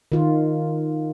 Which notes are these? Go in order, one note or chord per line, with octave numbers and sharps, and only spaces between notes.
D#3 F4